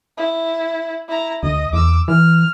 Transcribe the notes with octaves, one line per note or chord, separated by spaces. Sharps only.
E4
E4 A#5
D2 D#5
E2 D6 E6
E3 F6